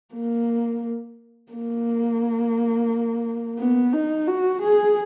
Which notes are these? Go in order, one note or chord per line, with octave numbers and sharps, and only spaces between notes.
A#3
A#3
B3
D#4
F#4
G#4